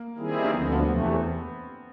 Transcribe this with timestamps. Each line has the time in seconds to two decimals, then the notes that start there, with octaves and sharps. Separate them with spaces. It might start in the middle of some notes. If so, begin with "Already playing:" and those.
Already playing: A#3
0.18 D#3 G3 C4 E4 G#4
0.44 A#3
0.51 D2 D3 F3 B3
0.62 C4
0.72 B3
0.83 E2 C3 E3 A3